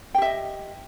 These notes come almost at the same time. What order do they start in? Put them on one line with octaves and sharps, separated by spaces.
G5 G4 E5 D#5